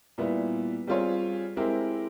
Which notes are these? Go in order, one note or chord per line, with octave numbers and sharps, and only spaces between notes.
A#2 G3 B3 E4
G3 C4 F4 G#4 C#5
G#3 C4 E4 G4 A#4